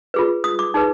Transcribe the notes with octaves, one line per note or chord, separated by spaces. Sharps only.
F4 G#4 B4
D#6
D6
D#4 G#4 B4